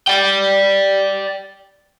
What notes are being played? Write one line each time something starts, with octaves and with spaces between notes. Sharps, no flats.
D5 G5